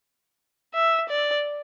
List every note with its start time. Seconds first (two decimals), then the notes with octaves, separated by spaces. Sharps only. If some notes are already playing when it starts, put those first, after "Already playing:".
0.74 E5
1.09 D5